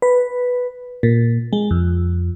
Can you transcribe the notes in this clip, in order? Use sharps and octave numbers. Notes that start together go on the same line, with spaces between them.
B4
A#2
G#3
F2